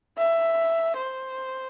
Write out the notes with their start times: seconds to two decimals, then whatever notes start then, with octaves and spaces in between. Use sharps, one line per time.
0.18 E5
0.97 C5